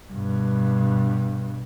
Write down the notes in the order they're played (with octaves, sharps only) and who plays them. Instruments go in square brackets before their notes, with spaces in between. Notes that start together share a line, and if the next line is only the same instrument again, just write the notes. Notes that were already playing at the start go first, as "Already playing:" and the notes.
[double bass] G2 B2